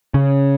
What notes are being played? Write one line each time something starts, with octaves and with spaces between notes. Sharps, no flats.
C#3